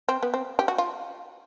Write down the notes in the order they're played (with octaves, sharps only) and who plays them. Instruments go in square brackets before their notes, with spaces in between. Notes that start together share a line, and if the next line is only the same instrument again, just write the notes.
[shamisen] C4
B3
C4
G4
F#4
F4